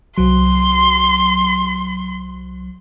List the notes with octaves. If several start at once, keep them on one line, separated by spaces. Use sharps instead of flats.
C2 F#3 C6